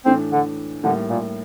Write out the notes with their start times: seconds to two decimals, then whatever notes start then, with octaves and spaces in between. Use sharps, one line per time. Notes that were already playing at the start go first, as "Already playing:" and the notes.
0.05 A2 E3 A3 C4 D4
0.32 D3
0.84 A2 D3 G3 A#3
1.09 A#2